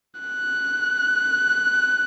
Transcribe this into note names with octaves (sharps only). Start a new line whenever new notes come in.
F#6